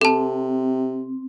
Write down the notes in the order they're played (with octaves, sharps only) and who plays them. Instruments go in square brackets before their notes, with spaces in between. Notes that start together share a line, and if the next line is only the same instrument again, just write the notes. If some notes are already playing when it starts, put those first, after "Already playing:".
[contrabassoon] C3 [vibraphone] C4 [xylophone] A4 A5